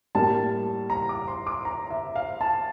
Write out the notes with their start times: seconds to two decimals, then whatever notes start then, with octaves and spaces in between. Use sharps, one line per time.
0.15 A2 G3 A#3 A5
0.90 A#5
1.09 D6
1.28 C6
1.47 D6
1.65 A#5
1.90 E5
2.16 F5
2.41 A5